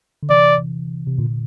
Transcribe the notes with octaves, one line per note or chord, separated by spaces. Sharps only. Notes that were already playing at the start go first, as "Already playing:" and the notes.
D3
C3 E3 D5
C3
A#2 D3